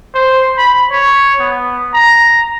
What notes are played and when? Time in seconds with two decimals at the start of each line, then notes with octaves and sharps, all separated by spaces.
0.14 C5
0.57 B5
0.91 C#5
1.39 B3
1.94 A#5